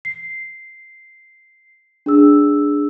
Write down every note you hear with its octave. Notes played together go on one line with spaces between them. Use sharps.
C7
D4 G#4 E6